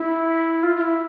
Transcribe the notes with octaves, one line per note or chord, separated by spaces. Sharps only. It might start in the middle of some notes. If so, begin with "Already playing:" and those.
Already playing: E4
F4
F4
E4